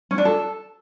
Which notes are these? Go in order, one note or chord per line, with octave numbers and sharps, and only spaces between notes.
C#4
D4
A4